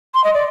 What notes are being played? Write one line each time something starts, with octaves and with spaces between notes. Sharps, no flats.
C6
D#5
D5